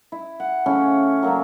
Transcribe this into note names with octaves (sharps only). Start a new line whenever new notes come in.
E4
F#5
C#3 A3 C#4 E4
F#3 A#3 C#4 D4